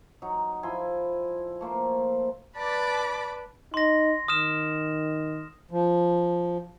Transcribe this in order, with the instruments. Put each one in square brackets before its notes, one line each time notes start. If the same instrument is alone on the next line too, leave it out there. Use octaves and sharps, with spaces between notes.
[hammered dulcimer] F#3 D#4
F3 E4 G#5 C6
A3 A#3 C5
[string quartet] B4 D5 A5 B5 D6
[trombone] D#4 [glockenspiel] C6 A#6
[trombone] D#3 [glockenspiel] D#6 F6 E7
[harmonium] F3